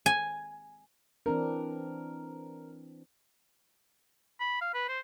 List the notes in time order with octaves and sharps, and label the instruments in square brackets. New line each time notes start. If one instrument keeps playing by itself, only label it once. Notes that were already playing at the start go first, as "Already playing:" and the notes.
[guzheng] G#5
[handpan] E3 C4 D4 [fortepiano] A#4
[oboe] B5
F5
B4
C5